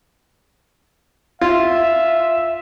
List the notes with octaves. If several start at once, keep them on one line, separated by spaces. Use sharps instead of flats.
F4 E5